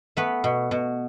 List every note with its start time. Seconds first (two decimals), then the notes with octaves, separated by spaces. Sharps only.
0.17 A3 B3 B4
0.44 B2
0.71 B2